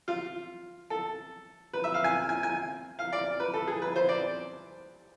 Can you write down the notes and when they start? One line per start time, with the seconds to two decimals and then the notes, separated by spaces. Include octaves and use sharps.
0.08 F4
0.90 A4
1.73 B4
1.84 E5
1.94 F5
2.04 G#5
2.29 G#5
2.43 G#5
2.99 F5
3.13 D5
3.40 B4
3.54 A4
3.68 G#4
3.82 B4
3.96 C5
4.09 D5